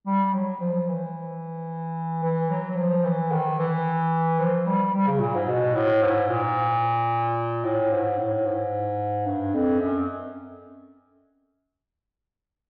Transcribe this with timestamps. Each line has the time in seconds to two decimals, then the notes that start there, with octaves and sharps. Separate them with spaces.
0.06 G3
0.34 F#3
0.60 F3
0.88 E3
2.24 E3
2.50 F#3
2.70 F#3
2.77 F3
3.04 E3
3.32 D#3
3.59 E3
4.39 F3
4.66 G3
4.94 G3
5.07 C#3
5.20 A#2
5.34 G#2
5.48 B2
5.75 A2
6.02 G#2
6.29 A#2
7.64 A2
7.92 G#2
8.18 A2
8.45 G#2
9.26 G2
9.54 F2
9.80 F#2